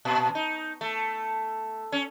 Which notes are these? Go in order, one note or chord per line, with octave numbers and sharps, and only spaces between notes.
A#2
D#4
A3
C#4